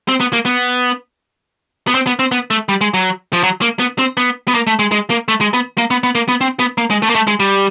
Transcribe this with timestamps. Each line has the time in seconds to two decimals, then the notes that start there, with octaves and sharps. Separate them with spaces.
0.09 C4
0.20 B3
0.33 A#3
0.46 B3
1.88 B3
1.95 C4
2.07 B3
2.19 C4
2.32 B3
2.51 A3
2.69 G3
2.81 G#3
2.94 F#3
3.33 F3
3.43 F#3
3.62 A#3
3.80 B3
3.99 C4
4.17 B3
4.48 B3
4.54 A#3
4.67 A3
4.79 G#3
4.91 G#3
5.10 A#3
5.28 A3
5.41 G#3
5.54 B3
5.78 A#3
5.91 B3
6.03 B3
6.15 A#3
6.29 B3
6.41 C4
6.59 B3
6.78 A#3
6.90 G#3
7.02 A3
7.10 A#3
7.15 A3
7.27 G#3
7.40 G3